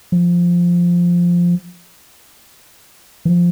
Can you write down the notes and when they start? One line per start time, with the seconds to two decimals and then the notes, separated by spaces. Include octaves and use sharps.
0.12 F3
3.25 E3
3.29 F3